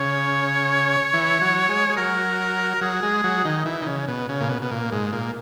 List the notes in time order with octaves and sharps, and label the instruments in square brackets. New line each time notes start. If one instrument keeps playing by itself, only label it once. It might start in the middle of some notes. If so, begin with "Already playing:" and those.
Already playing: [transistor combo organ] C#3 [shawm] C#5
[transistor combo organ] E3
F#3
G#3
G#3
[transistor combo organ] F#3 [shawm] A#4
[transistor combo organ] F#3 [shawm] G#4
[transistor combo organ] G#3
F#3
D#3
E3
D#3
C#3
B2
C#3
A#2
B2
B2
A#2
G#2
A#2